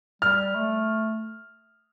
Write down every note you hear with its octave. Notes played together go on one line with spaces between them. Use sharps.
G3 F6
A3